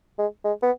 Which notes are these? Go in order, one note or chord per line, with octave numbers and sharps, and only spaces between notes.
G#3
G#3
B3